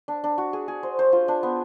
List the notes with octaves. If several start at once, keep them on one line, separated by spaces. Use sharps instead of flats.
D4
D4
F#4
G#4
G#4
C5
C5
F4
D4
B3